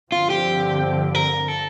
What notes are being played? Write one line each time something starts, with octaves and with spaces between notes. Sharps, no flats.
G2 D3 F3 C4 F4
G4
A#4
A4